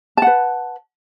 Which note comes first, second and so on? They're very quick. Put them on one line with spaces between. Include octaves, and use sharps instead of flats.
A5 F#5 B4